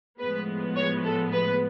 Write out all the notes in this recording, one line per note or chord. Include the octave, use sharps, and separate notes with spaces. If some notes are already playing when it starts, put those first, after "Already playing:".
A2 F3 G#3 B3 B4
C#5
A4
B4